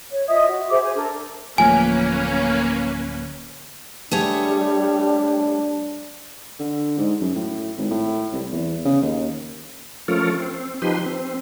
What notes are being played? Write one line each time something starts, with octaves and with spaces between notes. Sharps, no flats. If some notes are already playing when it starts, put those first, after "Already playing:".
C#5
F4 D#5 E5 D#6
F#4
G#4 C5 E5 D6
C5 G#5
D4 A4 A#4
D1 F3 A3 A#3 C#4 B4 G#5
G3 A3 D4 G#4 C#5
D3
G#2
F#2
A2
G#1
A2
C2
E2
C#3
D#2
F3 A3 C#4 F4 A4 A#4
C4
F3 D#4 G4 B4 C6
C4